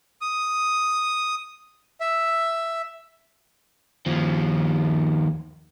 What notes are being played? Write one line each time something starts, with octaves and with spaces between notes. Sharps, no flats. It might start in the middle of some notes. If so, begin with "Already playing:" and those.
D#6
E5
D#2 F3